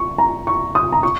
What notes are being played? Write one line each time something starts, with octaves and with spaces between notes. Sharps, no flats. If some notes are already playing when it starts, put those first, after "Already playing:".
Already playing: C#6
A#5
C#6
D#6
A#5
C#6